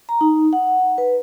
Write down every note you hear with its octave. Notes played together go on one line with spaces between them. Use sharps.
A#5
D#4
F#5
B4